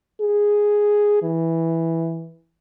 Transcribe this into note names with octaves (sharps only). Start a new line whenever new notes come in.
G#4
E3